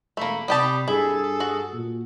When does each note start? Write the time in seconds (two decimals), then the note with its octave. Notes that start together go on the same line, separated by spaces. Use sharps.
0.17 E1 A3 A#3 B5
0.48 C3 G3 G4 A5 D#6
0.88 G2 E4 G#4 A4
1.40 F#4
1.74 A#2